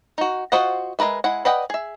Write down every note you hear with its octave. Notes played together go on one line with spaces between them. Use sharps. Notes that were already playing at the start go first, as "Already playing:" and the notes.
D#4 F#4
F4 F#4 C5 D#5 F#5
G#3 E4 A#4 B4 E5
G#3 E4 F#5
B4 D5 D#5 F#5 G5
G#4 E5